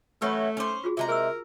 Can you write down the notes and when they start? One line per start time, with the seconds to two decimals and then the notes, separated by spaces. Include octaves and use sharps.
0.22 E3 F#3 A3 C#4 B4 C#5 B5
0.57 C#4 D#4 C5 D6
0.84 F4 F#4 G#4
0.97 C3 G#3 A#5
1.09 G#4 A#4 E6